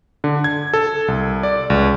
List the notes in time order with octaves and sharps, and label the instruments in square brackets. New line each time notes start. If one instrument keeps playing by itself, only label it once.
[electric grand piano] D3
G#6
A4
C2
D5
C#2